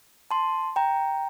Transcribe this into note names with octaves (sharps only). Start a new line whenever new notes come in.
A5 C6
G5 A#5